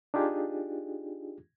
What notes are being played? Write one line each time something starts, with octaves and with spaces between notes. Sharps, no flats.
D4 D#4 F4 G4 G#4